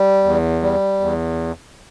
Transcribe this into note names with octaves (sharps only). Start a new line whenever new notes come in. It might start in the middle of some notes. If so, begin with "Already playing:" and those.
Already playing: G3
E2
G3
E2